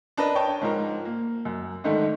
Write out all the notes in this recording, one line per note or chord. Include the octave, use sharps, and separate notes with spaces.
D4 A#4 B4 D#5
C#5 G5 A5
G#2 F3 A#4
A#3
F#2
G#2 D3 D#3 A3